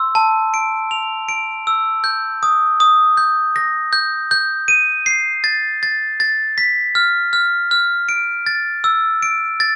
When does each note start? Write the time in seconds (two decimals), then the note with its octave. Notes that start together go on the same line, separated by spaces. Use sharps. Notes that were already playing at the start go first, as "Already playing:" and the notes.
Already playing: C6 E6
0.15 A5
0.54 D7
0.91 F7
1.29 D7
1.67 E6
2.04 G6
2.43 D#6
2.80 D#6
3.17 G6
3.56 A#6
3.93 G6
4.31 G6
4.68 D#7
5.06 C7
5.44 A6
5.83 A6
6.20 A6
6.58 B6
6.95 F6
7.33 F6
7.71 F6
8.09 D7
8.46 A6
8.84 E6
9.22 D7
9.60 A6